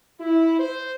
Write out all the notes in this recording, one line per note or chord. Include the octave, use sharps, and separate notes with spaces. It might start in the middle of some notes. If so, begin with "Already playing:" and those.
E4
C5